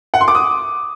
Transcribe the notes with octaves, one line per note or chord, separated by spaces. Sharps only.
F#5
C6
D6
D#6